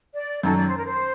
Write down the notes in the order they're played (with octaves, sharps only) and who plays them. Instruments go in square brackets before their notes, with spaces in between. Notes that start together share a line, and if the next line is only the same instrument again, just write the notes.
[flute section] D5
[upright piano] F#2 D#3 F#3 [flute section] A4
[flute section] D5
C5
A#4
C5